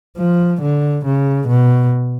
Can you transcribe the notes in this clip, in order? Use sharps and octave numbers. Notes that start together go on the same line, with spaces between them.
F3
D3
C#3
B2